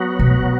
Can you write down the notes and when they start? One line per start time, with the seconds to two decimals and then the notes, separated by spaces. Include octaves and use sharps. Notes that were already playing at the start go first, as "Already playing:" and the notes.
Already playing: F#3 B3 F#4
0.19 B2